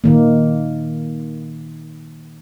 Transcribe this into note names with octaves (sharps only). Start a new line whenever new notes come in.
A#2 D#3 A#3